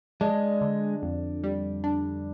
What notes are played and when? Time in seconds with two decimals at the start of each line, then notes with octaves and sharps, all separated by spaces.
0.21 G#3 D4
0.61 D3
1.02 F2
1.44 G3
1.84 D4